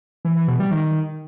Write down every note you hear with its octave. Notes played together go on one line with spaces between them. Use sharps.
E3
E3
B2
G3
D#3